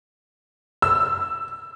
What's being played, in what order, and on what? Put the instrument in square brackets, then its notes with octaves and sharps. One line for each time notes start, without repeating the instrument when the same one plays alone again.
[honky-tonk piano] E6